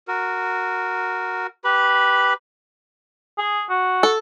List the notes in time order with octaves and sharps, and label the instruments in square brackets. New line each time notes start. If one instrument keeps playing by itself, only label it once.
[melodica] F#4 A#4
G4 B4 B5
[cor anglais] G#4
F#4
[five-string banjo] A4